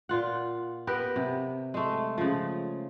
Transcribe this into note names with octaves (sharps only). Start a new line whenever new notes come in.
A#2 F4 F#5
B3 G4 A#4 B4
C3
G#3 A3
C#3 F3